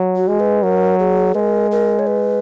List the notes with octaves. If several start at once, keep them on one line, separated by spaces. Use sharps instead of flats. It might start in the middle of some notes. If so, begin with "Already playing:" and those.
Already playing: F#3
F#4
G#3
B4
F#3 A#4
G#4
G#3 A#4 B4
A#4
C#5
B4